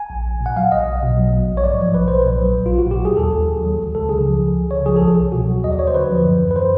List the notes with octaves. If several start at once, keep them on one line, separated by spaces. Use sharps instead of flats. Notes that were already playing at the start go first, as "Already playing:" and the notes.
Already playing: G#5
A#1
A#1
A#2
F#5
F#3 F5
B1 D#5
B1
B2
F#3
A#1
A#1
C#5
G#2 D5
F3
B1 B4
B1 C5
B4
A#2
F#3
A#1
A#1 F4
F#4
A#2 G4
F#3 G#4
D#2 A4
D#2
D#3
F#3
C#2
C#2 A4
C#3 G#4
F3
C#2
C#2
C#3 C#5
F3 G#4
A4
C2
G#4
C2
B2 F#4
F#3
D#2 D#5
D5
D#2 C#5
C5
D3 B4
F3
F#2
F#2
B4
D#3 C5